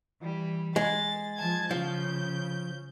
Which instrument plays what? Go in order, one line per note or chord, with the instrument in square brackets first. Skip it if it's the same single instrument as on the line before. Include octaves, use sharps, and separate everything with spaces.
[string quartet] E3 G3
[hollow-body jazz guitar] G#3 [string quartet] A6
[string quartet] F3 A5 G#6
[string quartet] C#3 G6 [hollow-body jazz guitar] F3